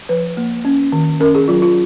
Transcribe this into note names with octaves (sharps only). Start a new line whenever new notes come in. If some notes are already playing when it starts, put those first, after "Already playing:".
F3 B4
A#3
C#4
D#3
C#4 A#4
G#4
F#3 F4
F4